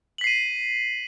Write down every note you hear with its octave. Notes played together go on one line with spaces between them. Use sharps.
B6 C7 D#7 F#7